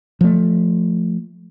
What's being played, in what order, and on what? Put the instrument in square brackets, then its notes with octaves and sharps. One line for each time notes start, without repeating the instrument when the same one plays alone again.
[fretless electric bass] F3 A3